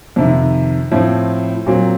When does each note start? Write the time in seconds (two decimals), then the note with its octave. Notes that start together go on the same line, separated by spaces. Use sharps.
0.16 F2 C3 D#3
0.91 A2 F3 C4
1.66 A#2 F#3 C4